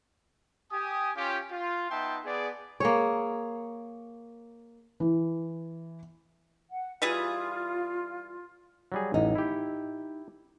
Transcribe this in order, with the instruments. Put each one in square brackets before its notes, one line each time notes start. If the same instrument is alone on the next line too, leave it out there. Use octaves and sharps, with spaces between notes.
[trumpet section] G4 G#5 D#6
C#4 F4 G4
F4
B3 D#4 E5 G5 A5 C6
B3 G#4 D5
[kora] A#3 G#4 C#5
[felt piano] E3
[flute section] F#5
[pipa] E3 G3 G#4 [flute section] F4
[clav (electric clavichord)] F#3 G3 G#4
[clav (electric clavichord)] A1 [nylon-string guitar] D#4
[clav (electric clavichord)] E4 G4